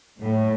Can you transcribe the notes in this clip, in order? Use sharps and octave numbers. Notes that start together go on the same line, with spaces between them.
A2